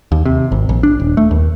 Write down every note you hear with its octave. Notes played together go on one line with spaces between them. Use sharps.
D#2
C3
G#1
A#1
D4
D#1
A3
D#2